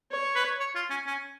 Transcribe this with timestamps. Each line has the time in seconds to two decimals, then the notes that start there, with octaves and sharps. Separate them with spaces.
0.12 C#5
0.36 B4
0.60 C#5
0.75 F4
0.90 C#4
1.07 C#4